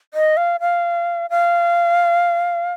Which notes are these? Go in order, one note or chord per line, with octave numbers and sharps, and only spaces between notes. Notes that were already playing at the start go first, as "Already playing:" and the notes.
D#5
F5
F5
F5